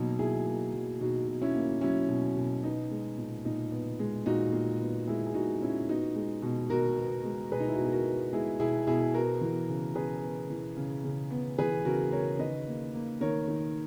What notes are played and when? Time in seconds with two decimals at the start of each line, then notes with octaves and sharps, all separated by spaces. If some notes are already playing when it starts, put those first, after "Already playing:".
Already playing: B2 F#3 A#3 D#4
0.19 B2 E4 G#4
0.46 A#3
0.73 F#3
1.00 B2 D#4 F#4
1.28 B2
1.42 C#4 E4
1.55 A#3
1.81 F#3 C#4 E4
2.08 B2
2.37 B2
2.64 B3 D#4
2.91 G#3
3.18 A#2
3.45 A#2 D#4
3.72 B3
3.99 G#3
4.26 A#2 D#4 F#4
4.52 A#2
4.80 B3
5.07 G#3 E4 G#4
5.26 G#4
5.34 A#2 D#4 F#4
5.62 A#2 C#4 E4
5.88 B3 D#4 F#4
6.15 G#3
6.42 B2
6.70 B2 F#4 A#4
6.97 B3
7.24 G#3
7.52 B2 G#4 B4
7.60 D#4
7.68 E4
7.75 B2 F#4
7.85 G#4
7.92 F#4 A#4
8.06 B3
8.33 G#3 E4 G#4
8.59 B2 E4 G#4
8.87 B2 E4 G#4
9.14 B3 F#4 A#4
9.41 E3
9.69 C#3
9.95 C#3 G#4 B4
10.23 B3
10.50 E3
10.76 C#3
11.04 C#3
11.31 B3
11.58 E3 G#4 B4
11.85 C#3 F#4 A#4
12.12 C#3 A#4 C#5
12.39 D#3 B4 D#5
12.67 A#3
12.94 A#3
13.21 D#3 A#4 C#5
13.48 D#3